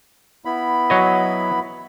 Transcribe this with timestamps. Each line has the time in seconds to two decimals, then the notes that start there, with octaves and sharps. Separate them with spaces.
0.45 B3 E4 B5
0.90 F#3 C#5 D#5